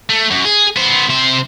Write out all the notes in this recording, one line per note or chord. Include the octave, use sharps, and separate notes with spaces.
A3
F#2
G#4
B3 C5
C3 C5